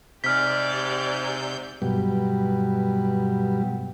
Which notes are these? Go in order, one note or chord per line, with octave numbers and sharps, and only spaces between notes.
G#2 C3 G4 D5 F6 G6 B6
G2 B2 F#3 G3